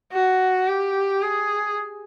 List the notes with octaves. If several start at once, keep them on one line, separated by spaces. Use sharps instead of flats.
F#4
G4
G#4